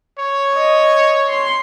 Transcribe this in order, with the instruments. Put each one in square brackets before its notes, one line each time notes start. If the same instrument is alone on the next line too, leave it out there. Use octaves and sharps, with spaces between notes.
[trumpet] C#5
[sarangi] D#5
C6